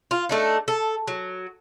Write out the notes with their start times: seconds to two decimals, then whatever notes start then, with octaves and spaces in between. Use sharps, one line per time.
0.11 F4
0.29 A3 D4 D#4
0.68 A4
1.07 F#3